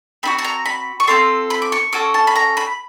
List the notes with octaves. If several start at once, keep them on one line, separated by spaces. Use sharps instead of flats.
C4 D#4 F#4 B5
A5
A#5
B5
C#6
C4 F4 A4 C6
B5
D6
C#6
C#4 F#4 A4 D6
A5
B5
A#5
B5